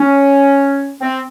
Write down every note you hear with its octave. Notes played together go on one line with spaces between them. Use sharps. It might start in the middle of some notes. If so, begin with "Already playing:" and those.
Already playing: C#4
C4